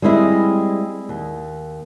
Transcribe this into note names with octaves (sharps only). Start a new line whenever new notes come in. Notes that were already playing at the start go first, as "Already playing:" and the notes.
G3 G#3 C4 E4 G#4 D#5
D#2